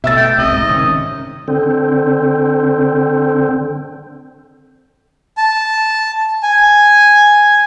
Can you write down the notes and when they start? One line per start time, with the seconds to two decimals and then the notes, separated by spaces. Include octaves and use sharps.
0.04 B2 A3 E5 E6 A6
0.17 G5
0.38 C2 C3 D#5
0.52 G#2
0.69 C3 D#3 C#4
1.48 D3 C4
5.37 A5
6.43 G#5